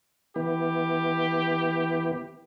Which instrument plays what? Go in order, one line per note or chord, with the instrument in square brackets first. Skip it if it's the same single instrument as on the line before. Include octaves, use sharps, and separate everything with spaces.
[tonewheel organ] E3 B3 [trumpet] G4